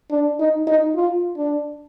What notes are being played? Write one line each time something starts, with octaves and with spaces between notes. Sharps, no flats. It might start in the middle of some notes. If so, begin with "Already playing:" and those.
D4
D#4
D#4
F4
D4